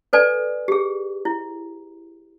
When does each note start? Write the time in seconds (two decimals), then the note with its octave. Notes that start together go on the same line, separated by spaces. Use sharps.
0.13 A4 B4 D5 G#5
0.68 G4 G#4
1.25 E4